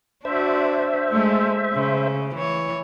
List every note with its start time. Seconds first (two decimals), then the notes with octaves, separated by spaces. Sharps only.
0.25 D4 F#4 C5 E5
1.10 G#3 A3
1.73 C#3
2.35 E3 C#5